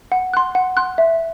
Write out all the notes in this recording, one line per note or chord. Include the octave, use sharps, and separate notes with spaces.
F#5
C6 F#6
F#5
C6 F#6
E5